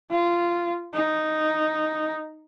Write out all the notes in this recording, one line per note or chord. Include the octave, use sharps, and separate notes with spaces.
F4
D#4